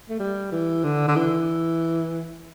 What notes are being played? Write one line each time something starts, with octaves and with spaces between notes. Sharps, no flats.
A3
G3
E3
D3
D3
E3